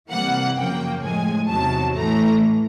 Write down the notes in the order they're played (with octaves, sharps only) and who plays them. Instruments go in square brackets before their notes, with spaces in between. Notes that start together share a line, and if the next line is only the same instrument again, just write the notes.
[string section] C3 E3 G3 A#3 F#5
F#2 C#3 F3 A#3 G5
A2 F3 G#3 G#5
E2 C3 D#3 F#3 A5
A2 E3 A3 A#5